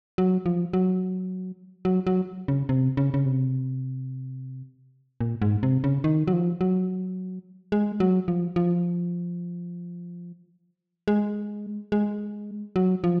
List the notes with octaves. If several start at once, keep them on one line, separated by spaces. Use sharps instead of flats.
F#3
F3
F#3
F#3
F#3
C#3
C3
C#3
C#3
C3
A#2
G#2
C3
C#3
D#3
F#3
F3
F#3
G#3
F#3
F3
F3
G#3
G#3
F#3
F3